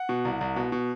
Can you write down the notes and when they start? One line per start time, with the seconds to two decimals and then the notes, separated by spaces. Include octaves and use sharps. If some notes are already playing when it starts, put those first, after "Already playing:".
Already playing: F#5
0.09 B2
0.25 C2
0.41 C2
0.56 B2
0.72 B2